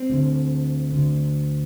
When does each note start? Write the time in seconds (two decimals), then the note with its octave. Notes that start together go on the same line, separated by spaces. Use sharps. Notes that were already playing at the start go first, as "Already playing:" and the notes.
Already playing: C4
0.10 D2 D3
0.92 D2 D3